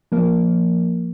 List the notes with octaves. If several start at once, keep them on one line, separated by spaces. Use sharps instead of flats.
F3 A#3